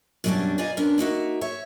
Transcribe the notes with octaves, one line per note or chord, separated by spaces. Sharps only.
F#2 B2 G3 A3 C#4 D4
B3 F4 D5 D#5 G#5 A#5
B3 C#4 D4 A#4
A#3 D#4 F#4 E5
C#5 E5